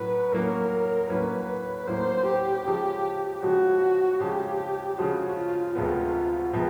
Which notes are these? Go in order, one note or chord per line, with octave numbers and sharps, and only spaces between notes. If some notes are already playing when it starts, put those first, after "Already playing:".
Already playing: A2 F#3 C#4 B4
A2 F#3 A#3 C#4 A#4
A2 F#3 A#3 C#4 B4
A2 F#3 A#3 C#4 C5
G4
C#3 F3 G#3
C#3 F3 G#3 F#4
C#3 F3 G#3 G4
C#3 F3 G#3 F#4
F4
D2 C3 F3 G#3 B3 F4
C3 F3 G#3 B3